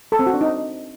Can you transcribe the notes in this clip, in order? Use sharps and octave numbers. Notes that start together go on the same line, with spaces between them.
A4
C4
F#4
D4
D#4